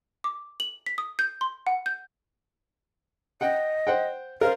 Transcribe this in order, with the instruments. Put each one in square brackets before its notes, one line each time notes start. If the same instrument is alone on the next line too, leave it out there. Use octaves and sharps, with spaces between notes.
[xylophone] D6
F#7
B6
D#6
G6
C6
F#5
G6
[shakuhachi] D#5 [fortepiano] F#5 G5
[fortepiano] C5 F#5 G5
[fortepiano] A#4 C5 [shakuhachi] F5